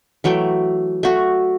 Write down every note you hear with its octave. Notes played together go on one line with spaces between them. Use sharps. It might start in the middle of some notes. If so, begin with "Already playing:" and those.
E3 F#3 A3 G5
A3 F#4